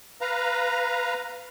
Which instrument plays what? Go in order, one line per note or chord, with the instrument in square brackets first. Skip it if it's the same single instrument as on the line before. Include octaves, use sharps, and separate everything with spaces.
[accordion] B4 F5 A#5